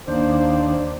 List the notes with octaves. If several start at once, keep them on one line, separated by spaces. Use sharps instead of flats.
D#2 A#3 D4 C5